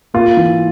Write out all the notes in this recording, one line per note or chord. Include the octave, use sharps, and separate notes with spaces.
A#3 F4
E3